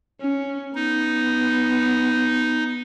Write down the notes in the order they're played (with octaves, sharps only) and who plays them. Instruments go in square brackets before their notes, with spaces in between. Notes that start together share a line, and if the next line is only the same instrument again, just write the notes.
[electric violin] C#4
[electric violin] B3 [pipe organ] D#4